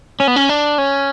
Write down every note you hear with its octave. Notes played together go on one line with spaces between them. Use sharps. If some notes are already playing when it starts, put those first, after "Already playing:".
C#4
B3
C#4
D4
C#4